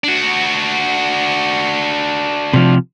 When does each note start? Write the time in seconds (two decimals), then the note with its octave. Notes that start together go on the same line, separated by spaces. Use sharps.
0.04 D4 F#4
2.54 C3 F3